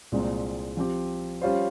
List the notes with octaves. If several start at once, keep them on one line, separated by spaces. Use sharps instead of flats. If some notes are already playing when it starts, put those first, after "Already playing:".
C2 A#2 G#3 C4
F3 C4 G4
G3 C#4 F4 C5